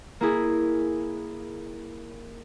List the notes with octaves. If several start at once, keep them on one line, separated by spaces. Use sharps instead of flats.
A#3 E4 G#4